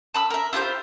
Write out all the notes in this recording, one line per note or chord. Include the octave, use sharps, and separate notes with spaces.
A5 B5 E6
A#4 E5
E4 F4 G4 C5